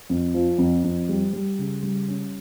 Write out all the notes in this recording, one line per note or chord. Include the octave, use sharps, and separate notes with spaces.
F2
F3
F2
F2
G3
G3
C#3
G3
C#4